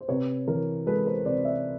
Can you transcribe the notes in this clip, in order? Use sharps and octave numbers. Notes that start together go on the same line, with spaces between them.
C5
C3 B4 C#5
E3 A#4
G#3 A4 B4
A#4 C5
C3 C5 D5
D5 E5